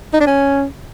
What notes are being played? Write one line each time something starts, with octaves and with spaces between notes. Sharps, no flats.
D#4
D4
C#4